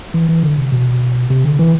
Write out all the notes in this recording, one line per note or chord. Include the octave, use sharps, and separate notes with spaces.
E3
E3
D3
C3
B2
C3
D3
E3